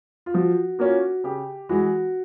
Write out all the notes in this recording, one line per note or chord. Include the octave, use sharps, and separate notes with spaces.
F4
F3 F#4
A#3 C#4 F4 F#4
C#3 G4
E3 G#3 F#4